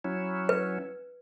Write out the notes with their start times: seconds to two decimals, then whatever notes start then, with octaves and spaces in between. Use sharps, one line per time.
0.04 F#3 C#4 E4
0.49 B4